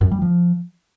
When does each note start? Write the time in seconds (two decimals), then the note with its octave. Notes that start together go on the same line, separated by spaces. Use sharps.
0.01 F#2
0.11 G3
0.22 F3